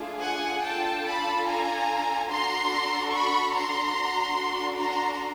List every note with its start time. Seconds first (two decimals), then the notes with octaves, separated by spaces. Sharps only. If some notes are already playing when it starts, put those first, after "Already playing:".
Already playing: A3 D4 F4 G#4
0.22 F#5 G#5
0.63 D4 F4 A4 G5 A5
1.05 A5 B5
1.46 G#5 A#5
2.29 D4 F#4 A4 A#5 C6
3.12 B5 C#6
3.54 A#5 C6
3.96 D4 F#4 A4
4.78 A#5 C6